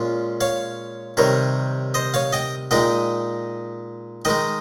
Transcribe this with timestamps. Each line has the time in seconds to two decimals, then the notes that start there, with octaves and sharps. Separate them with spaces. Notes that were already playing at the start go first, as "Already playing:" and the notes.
Already playing: A#2 G#3 C#4 F4
0.41 C#5 F5
1.17 C3 D#3 G3 A#4 C#5
1.94 C5 D#5
2.14 C#5 F5
2.32 D#5 G5
2.71 A#2 G#3 D#4 D#5 G5
4.25 D#3 G#3 D#4 D#5 G5